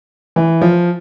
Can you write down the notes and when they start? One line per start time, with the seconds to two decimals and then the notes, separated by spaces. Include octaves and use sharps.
0.36 E3
0.61 F3